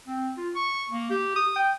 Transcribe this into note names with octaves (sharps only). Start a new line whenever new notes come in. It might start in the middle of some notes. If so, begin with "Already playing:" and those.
C4
F4
C#6
A#3
G4
D#6
G5